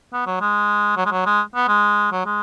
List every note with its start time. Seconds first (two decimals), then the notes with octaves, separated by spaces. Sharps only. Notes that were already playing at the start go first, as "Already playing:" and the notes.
0.13 B3
0.26 F#3
0.41 G#3
0.97 F#3
1.06 G#3
1.11 F#3
1.26 G#3
1.55 B3
1.68 G#3
2.12 F#3
2.26 G#3